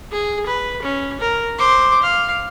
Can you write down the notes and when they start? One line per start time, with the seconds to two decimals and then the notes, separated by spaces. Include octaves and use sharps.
0.11 G#4
0.46 B4
0.82 C#4
1.20 A#4
1.58 C5 D6
2.02 F5